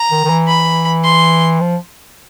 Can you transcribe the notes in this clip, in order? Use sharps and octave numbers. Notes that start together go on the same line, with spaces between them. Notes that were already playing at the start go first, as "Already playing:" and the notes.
Already playing: A#5
D#3
D#3
E3
B5
C6
F3